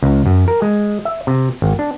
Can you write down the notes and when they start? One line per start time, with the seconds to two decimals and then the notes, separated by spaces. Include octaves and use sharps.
0.03 C#2
0.26 F#2
0.48 A#4
0.62 G#3
1.05 E5
1.27 C3
1.62 G#1
1.79 D4